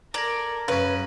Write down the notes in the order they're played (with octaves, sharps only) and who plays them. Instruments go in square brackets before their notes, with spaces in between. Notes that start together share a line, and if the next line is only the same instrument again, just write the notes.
[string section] A4 A#4 [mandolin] D5 [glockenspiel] A#5 G#6 A#6
[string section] F#2 F#3 [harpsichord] C#3 C#4 [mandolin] B4